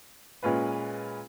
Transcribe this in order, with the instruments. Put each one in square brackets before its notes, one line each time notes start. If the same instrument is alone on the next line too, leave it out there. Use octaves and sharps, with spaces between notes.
[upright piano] A#2 G#3 C#4 F4 B4